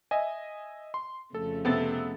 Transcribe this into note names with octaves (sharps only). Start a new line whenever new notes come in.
D#5 E5 G#5
C6
F2 C#3 A3 A4
C3 B3 C4 A4 A6